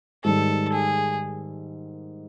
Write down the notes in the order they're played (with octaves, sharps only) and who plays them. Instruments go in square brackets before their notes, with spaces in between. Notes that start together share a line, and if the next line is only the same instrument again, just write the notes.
[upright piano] G#2 D#3 G3 [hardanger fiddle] A4
[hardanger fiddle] G#4